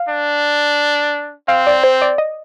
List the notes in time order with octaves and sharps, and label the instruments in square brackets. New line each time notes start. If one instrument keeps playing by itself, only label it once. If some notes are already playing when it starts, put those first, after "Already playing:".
Already playing: [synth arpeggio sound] F5
[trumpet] D4
[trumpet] C4 [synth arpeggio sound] F5
[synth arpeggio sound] D5
C5
D5
D#5